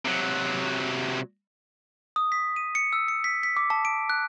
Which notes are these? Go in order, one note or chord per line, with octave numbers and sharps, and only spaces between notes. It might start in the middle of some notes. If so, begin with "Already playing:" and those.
C3 F#3
D#6
B6
D#7
C#7
E6
C#7
B6
B6
D6
A5
D7
F#6